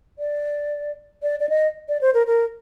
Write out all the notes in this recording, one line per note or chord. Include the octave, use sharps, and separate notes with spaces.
D5
D5
D5
D#5
D5
C5
A#4
A#4